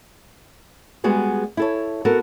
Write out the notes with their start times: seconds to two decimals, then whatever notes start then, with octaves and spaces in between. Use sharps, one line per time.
1.04 G3 G#3 B3 F#4 G#4 B4
1.57 E4 A4 C#5
2.05 B3 F#4 A4 A#4